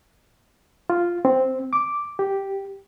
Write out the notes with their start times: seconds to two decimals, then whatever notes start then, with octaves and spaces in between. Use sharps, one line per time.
0.90 F4
1.25 C4
1.73 D6
2.19 G4